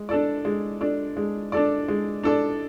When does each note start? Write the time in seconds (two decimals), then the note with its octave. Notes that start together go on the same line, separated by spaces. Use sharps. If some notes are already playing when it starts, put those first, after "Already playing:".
Already playing: G#3
0.09 D4 A4 D5
0.45 G#3
0.81 D4 A4 D5
1.17 G#3
1.52 D4 A4 D5
1.88 G#3
2.23 D4 A4 D5